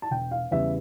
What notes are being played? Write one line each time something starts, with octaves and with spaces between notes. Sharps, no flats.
A5
E1 G5
F5
E2 C#3 G3 E5